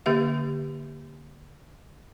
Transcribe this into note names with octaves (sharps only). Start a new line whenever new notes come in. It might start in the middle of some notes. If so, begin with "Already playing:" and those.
D3 A#3 G4 E5 F5